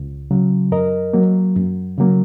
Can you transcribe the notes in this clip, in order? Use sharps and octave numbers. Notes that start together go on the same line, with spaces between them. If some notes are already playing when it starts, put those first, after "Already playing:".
Already playing: C#2
C#3 F#3
F#2 A#4 D#5
F#3 A#3
F#2
C#3 F#3 A#3